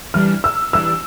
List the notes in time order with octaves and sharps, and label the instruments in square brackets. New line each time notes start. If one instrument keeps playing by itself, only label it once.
[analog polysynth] E3 G3 D4 [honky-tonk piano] F6
[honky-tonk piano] E6
[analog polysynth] E3 G3 D4 [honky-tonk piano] E6